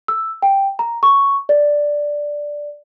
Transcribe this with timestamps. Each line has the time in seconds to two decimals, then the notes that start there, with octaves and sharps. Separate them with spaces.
0.08 E6
0.42 G5
0.79 A#5
1.03 C#6
1.49 D5